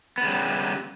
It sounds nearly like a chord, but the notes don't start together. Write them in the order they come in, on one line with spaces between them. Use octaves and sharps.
B3 C#3 G3